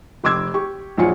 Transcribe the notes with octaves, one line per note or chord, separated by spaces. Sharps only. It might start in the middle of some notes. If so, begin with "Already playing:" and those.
F1 C6 D6 E6 G#6
G4 C#6
A#1 F#3 F4 G#5 C#7